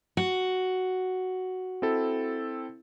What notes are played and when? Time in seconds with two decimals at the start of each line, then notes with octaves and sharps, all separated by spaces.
0.17 F#4
1.82 C4 E4 A4